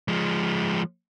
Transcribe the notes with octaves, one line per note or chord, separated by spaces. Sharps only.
F3 G#3